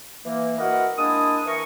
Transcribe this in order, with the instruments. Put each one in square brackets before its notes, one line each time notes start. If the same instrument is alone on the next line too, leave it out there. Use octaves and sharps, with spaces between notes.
[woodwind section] E3 A#3
E4 F#4 A#4 B4 D#5 F#5
G#3 A#3 D4 E4 D#6
E3 A#4 C#6